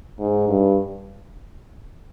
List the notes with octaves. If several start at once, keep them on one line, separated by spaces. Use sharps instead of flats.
G#2
G2